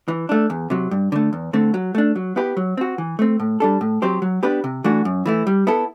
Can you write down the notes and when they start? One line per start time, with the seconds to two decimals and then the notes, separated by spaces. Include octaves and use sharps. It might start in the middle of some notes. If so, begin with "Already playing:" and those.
0.08 E3
0.29 A3 D4
0.50 E2
0.70 C3 F#3
0.91 G2
1.12 D3 A3
1.33 E2
1.53 D3 A3 C4
1.74 F#3
1.95 A3 D4
2.16 F#3
2.36 B3 E4 G4 B4
2.57 F#3
2.77 C4 F#4
2.98 E3
3.19 A3 C4
3.40 A2
3.60 G3 D4 A4
3.81 A2
4.02 F#3 C4 G4 C5
4.22 F#3
4.43 B3 D4 G4 B4
4.64 C3
4.84 E3 A3 D4 F#4
5.05 F#2
5.26 E3 A3 E4
5.47 G3
5.67 B3 E4 A4